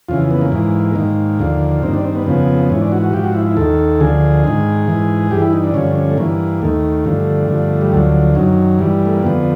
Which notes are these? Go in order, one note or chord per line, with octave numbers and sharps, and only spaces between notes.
F2 C#3 E3 F4
B3
A#3
G#2 E3
G#2 D#3 A#3
D#2 D3 F3
G2 D#3 C4
D4
C4
B3
F2 C#3 F3 B3
G#2 E3 C#4
D4
F#4
F#4
G#2 F3 G4
F#4
E4
E4
D#2 D#3 A4
D2 D3 F3 G#4
G#2 D#3
G#2 E3
G2 E3 G4
E4
D#4
D4
G2 D3 F3 C#4
C#4
A3
G2 E3 A#3
D#2 D#3 A3
G2 D3 F3
G2 D3 F3
G3
D2 D3 F3 F#3
F#2 D#3 F#3
G2 E3 G3
A3
A#3
F2 D3 F3 B3